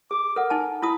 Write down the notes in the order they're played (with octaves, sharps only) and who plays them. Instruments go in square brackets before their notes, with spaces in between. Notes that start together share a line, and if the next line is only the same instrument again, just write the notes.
[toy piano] G#4 [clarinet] D6
[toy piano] A4 F#5 [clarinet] A#4
[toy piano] D#4 G#5 A5
[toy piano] E4 A5 D#6 [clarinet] B5